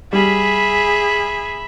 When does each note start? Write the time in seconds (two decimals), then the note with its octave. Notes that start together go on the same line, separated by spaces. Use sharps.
0.13 G3 G#4 E5 B5